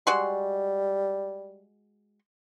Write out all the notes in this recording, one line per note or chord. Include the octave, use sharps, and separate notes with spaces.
G3 G#3 F#4 C6